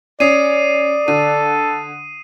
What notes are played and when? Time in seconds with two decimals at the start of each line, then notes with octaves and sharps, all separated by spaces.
0.20 C#4 D5 D#6 C7 D#7
1.08 D3 A4 D#7